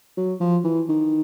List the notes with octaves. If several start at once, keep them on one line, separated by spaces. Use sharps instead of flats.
F#3
F3
E3
D#3